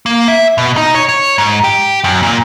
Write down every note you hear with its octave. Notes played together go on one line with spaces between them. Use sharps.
A#3
E5
B2
D#4
C#5
C#5
G#2
G4
F#2
A#2